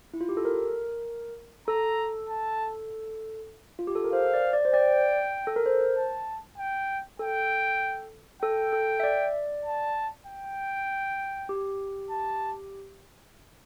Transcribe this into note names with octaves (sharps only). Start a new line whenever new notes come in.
E4
F4
G4
A4
A#4
A4 A#5
A5
F4
G4
A4
A#4
C5 F5
D5
D5
C5
D5 G5
A4
A#4
C5
A5
G5
A4 G5
A4 G5
A4
E5
D5
A5
G5
G4
A5